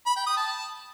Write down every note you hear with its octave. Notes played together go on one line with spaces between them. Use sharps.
B5
G5
D#6
A5